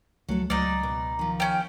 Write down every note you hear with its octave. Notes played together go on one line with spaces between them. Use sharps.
C#2 F3 F#3 A3 A4
C#2 F#3 D#4 D5
B2
D#3 F3
C#4 G5